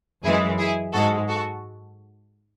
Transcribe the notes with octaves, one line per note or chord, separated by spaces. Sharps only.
F#2 E3 G#3 E4 G#4
E4 G#4
G#2 G#3 F#4 A4
F#4 A4